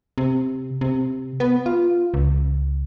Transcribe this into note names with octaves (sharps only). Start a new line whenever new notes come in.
C3
C3
B3
F4
C#2